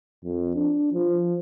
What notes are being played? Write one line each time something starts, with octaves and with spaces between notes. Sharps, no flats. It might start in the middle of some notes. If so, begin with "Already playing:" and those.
F2
D4
F3